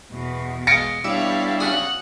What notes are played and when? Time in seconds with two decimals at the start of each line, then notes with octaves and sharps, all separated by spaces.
0.11 E2 B2
0.67 G#3 F5 A#6 C#7 D7
1.04 G3 B3 D4 E4 C#5 E5 F5
1.60 C#3 F#4 G#4 F#5